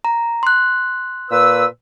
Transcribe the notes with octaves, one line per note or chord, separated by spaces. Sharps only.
A#5
C6 F#6
A#2 B4 E6